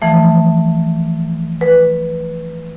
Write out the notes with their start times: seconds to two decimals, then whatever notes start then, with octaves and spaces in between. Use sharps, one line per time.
0.02 E3 F3 A3
1.61 B4